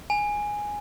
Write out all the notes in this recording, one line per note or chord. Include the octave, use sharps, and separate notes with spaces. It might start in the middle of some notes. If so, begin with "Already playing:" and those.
G#5